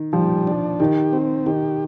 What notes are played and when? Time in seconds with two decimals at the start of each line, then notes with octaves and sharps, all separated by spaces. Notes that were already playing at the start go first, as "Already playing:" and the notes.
Already playing: D#3
0.13 F3 G3
0.47 D4
0.80 D#3 G4
1.13 C4
1.46 D#3 G4